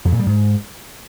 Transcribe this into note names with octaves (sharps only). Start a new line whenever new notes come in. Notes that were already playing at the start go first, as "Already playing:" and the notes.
F2
A#2
G3
G#2